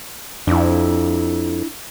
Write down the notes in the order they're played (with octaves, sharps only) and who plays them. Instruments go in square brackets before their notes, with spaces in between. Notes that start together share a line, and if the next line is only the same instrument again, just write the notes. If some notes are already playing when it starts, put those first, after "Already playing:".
[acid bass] F2 [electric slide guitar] D4 E4